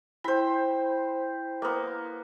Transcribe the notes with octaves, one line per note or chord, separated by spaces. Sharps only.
E4 C5 G5 B5
A#3 B3